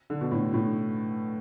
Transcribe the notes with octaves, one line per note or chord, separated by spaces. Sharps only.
D3
B2
A2
A2